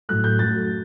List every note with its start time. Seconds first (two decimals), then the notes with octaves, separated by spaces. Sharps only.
0.09 A2 F#3 A3 F#6
0.24 G6
0.39 F#2 F#3 A3 A6